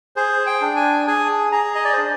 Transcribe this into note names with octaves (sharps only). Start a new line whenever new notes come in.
G#4 C5
G5
D4
G#5
G#4 G#5
G#4 A#5
D#5
D5
C5
D4